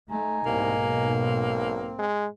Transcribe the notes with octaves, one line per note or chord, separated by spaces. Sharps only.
A3 D#4 G#5 A#5
C2 G#2 B2 A#3
B1
C4
G#3